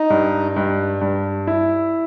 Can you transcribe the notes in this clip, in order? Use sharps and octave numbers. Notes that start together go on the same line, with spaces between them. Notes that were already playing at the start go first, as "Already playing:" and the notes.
Already playing: D#4
G2
G2
G2
E4